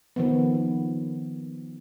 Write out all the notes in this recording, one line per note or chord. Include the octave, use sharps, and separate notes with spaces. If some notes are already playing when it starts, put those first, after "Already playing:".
D#3 F3 B3